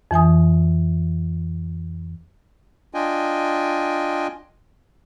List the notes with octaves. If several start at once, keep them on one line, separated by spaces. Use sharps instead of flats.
F2 E3 G#5 D#6
D4 F4 D#5 G5 G#5